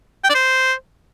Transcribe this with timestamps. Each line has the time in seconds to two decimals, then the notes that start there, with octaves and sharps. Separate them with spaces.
0.24 G5
0.29 D5
0.35 C5